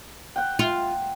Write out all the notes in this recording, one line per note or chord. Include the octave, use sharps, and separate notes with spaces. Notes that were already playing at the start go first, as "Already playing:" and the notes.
F#5 G5
F4